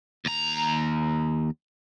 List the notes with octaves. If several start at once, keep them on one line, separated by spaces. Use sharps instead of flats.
D#2 A#5